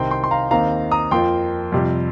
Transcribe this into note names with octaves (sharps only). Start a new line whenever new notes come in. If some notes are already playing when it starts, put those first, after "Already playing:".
Already playing: C2 C3 D#3 C4 G5 C6
G5 C6
C6
F5 A#5
D#2 D#3 C4 F5 A#5
A#5 D#6
F2 F3 A#3 G5 C6
F2 C3 G3